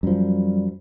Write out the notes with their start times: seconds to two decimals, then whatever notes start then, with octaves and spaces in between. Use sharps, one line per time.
0.03 F#2 F3 G3